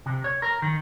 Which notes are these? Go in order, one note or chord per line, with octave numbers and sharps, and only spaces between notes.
C3
C#5
A#4
D#3